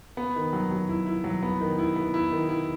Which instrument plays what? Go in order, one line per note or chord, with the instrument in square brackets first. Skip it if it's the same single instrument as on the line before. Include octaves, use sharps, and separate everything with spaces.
[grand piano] B3
D#3
F#3
F#3
E4
E4
F#3
B3
D#3
E4
B3
E4
D#3
E4